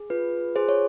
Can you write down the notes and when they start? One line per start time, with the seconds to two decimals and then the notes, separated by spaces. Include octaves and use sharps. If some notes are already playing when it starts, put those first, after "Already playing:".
Already playing: G#4
0.10 F4 B4
0.56 G#4 C5
0.69 C#5